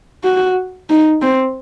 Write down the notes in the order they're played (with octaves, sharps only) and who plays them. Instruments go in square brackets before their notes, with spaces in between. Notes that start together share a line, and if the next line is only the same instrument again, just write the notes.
[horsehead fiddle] F#4
D#4
C4